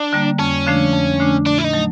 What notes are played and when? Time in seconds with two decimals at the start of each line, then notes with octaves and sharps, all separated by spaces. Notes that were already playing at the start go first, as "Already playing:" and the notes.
Already playing: D4
0.13 D3 G3 A#3
0.39 F2 C#4
0.67 D3 F3 A3 D4
0.93 F2
1.20 D3 F3 A3 D4
1.47 A#2 D4
1.58 E4
1.64 D#4
1.73 F#3 A3